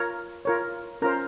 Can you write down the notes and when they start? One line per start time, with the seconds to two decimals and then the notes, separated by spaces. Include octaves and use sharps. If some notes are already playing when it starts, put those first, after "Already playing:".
Already playing: F4 A#4 C#5 A#5
0.45 F4 A#4 C#5
1.02 C#4 F4 A#4 C5 A#5